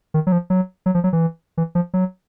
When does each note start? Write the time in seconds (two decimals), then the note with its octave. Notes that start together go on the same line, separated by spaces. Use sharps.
0.14 D#3
0.27 F#3
0.32 F3
0.50 F#3
0.86 F#3
0.94 F3
1.04 F#3
1.13 E3
1.57 E3
1.75 F3
1.94 F#3